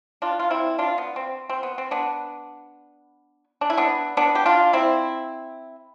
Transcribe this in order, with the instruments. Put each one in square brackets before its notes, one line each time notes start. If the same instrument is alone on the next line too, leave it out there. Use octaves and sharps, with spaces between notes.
[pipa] D4 F4
F4
C4 E4
D4 F4
B3
C4
C4
B3
C4
B3 D4
D4
E4
B3 D4
B3 D4
G4
D4 F4
C4 E4